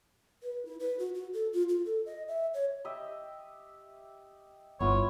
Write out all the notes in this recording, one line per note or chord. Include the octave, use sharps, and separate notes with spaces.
B4
E4
B4
F#4
F#4
A4
F4
F4
A4
D#5
E5
C#5
G4 D#5 E5
G1 B3 E4 F4 C#5